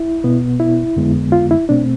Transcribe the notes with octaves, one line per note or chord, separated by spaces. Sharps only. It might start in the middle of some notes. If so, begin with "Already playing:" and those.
Already playing: E4
B2 B3
E4
F2 D3 G#3 B3
F4
E4
B2 A3 C4 D4